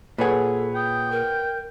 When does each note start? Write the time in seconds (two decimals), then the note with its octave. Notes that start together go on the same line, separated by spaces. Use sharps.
0.18 A#2 G#4 A4 B4 C#5 F#5
0.75 G5 D#6
1.11 A#4